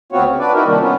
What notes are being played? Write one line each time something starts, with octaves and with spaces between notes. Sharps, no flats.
D2 B3 C4 F4 F#4 C#5
C#3
D4 B4 D5
D#4 E4 F#4 A#4
C3 D#3 F3 G3 A#3 D4
B3 C#4 F4